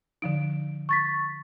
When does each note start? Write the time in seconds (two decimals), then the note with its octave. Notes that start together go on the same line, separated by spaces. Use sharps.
0.22 D3 F3 D#4 D7
0.89 C#6 A6 B6